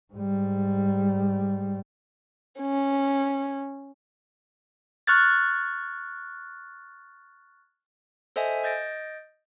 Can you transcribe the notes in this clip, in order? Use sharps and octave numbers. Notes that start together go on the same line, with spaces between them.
G#2 G3
C#4
C#6 F6 F#6 G#6 A6
A4 C5 D#5 E5 G#5
D#5 G6 A6 A#6 D7